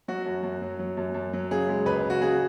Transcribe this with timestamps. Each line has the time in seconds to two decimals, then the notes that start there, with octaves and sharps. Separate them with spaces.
0.08 F#3 F#4
0.26 F#2
0.43 F#2
0.61 F#3
0.79 F#3
0.97 F#2
1.14 F#2
1.33 F#3
1.51 C#3 G#4
1.69 G#3
1.86 C#2 B4
2.04 C#2
2.10 F#4
2.22 C#3 G#4